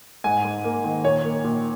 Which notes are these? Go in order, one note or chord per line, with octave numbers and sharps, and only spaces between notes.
G#2 G#5
G#2
A#3
D#3
A#2 C#5
A#3
A#2